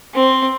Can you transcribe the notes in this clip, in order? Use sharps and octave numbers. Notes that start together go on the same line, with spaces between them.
C4